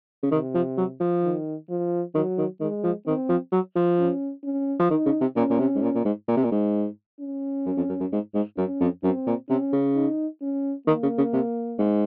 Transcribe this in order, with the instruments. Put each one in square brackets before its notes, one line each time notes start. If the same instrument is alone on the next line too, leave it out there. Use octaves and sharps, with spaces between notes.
[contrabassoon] C#3
[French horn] C3 [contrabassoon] D#3
[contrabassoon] F3
F#3
F3
[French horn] D#3
F3
[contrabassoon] D#3 [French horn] F#3
[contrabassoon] D#3
[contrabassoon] D#3 [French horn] G#3
[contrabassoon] F3
[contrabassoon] D#3 [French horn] C4
[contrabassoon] F3
F#3
F3
[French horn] C#4
C#4
[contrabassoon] F3
[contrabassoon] D#3 [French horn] D#4
[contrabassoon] C#3
C3
[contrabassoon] A#2 [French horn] C#4
[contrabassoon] A#2
C3
G#2
A#2
A#2
G#2
A#2
C3
A#2
G#2
[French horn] C#4
[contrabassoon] F#2
F2
F#2
F#2
G#2
G#2
[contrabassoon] F#2 [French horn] C#4
[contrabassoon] F2
[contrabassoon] F#2 [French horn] C4
[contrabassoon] A#2
[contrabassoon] C3 [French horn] C#4
[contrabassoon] C#3
[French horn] D#4
C#4
[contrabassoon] D#3 [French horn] A#3
[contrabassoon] C#3
C#3
C3
G#2